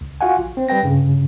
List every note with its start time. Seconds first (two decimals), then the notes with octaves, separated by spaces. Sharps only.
0.01 C#2
0.21 F4 F#4 F5 F#5 G#5
0.39 A#1
0.57 C4
0.69 G3 B4 G5 A#6
0.83 G2 C#3